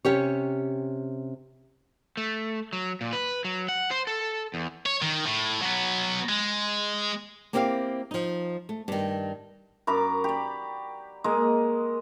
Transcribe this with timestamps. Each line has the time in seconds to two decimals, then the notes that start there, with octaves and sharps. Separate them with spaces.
0.05 C3 C#4 G4 C#5
2.17 A3
2.73 F#3
3.01 A#2
3.13 B4
3.45 F#3
3.68 F#5
3.91 C5
4.07 A4
4.54 E2
4.86 C#5
5.02 D#3
5.26 A2
5.62 F#3 B3
6.29 G#3
7.53 A#3 C4 E4 G4 D#5 F5
8.11 F3 D#4
8.69 A3
8.88 G2 D#3
9.87 F#2 A#5 B5 D6
10.24 G4 D5
11.24 G#3 A#3 D#5